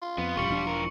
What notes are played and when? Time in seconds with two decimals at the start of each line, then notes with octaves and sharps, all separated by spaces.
0.02 F4
0.18 F2 B3
0.37 D#1 F#2 G3 C#6 C#7 F#7
0.48 E1 F3 D4
0.67 E3 A#4